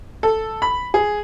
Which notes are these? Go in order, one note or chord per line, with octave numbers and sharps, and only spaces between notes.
A4
B5
G#4